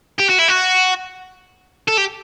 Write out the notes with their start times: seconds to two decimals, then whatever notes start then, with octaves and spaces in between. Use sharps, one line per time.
0.20 G4
0.30 F#4
0.39 E4
0.48 F#4
1.88 A4
1.97 G4